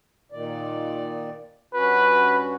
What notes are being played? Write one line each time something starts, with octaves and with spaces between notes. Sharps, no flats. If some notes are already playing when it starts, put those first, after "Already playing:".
A#2 D#3 D5
G2 C#4 F#4 B4